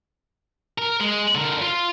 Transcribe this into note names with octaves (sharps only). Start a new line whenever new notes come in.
A#4
G#3
D3 A#4
F4